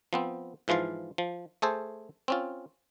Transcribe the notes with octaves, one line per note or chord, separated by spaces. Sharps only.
F3 B3 C4
G#2 E3 F3 F4 F5
F3
A3 G#4 A4 C5
C4 C#4 F4